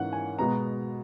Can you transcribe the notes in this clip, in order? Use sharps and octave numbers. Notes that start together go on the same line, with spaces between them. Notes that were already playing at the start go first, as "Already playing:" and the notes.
Already playing: G#2 E3 A#3 C#4 F#5
G#5
B2 G#3 B3 A#5